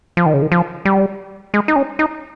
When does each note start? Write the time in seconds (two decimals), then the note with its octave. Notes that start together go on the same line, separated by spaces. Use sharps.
0.17 F3
0.26 D#3
0.34 C#3
0.42 D#3
0.52 F3
0.85 G3
1.54 G#3
1.68 D#4
1.76 C#4
1.99 D#4